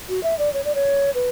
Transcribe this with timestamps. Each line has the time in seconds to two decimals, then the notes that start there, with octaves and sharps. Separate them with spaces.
0.09 F#4
0.23 E5
0.39 D5
0.54 C#5
0.65 D5
0.75 C#5
1.15 B4